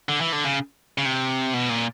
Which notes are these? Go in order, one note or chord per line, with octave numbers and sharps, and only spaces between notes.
D3
E3
D3
C#3
C#3
C3
B2
A#2